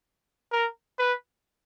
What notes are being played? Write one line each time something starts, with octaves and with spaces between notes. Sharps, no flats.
A#4
B4